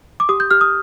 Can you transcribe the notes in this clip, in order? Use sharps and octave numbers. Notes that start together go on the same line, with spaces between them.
D6
G4 D#6
G6
G4 F6
D#6